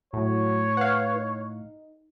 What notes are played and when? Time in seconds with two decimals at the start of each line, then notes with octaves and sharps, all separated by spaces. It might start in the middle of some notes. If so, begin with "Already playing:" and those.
0.13 A2 F#3 C#5
0.77 B4 F5 F#5
1.16 D#4